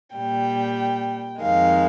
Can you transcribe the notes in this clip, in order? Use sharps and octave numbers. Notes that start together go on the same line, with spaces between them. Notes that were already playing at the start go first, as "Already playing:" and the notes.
A#2 G3 G5
F2 D#3 G#3 F5